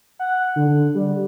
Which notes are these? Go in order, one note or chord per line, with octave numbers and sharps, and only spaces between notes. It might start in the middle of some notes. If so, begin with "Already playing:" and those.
F#5
D3
G3